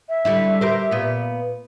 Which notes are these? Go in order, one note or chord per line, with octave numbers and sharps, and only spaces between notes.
E5
D3 G3 E4
G4 A#4 C5
A#2 B3